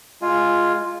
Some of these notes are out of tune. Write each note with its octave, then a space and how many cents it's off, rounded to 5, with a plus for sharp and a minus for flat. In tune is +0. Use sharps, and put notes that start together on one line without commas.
G#3 +0 F4 +0 G#5 +0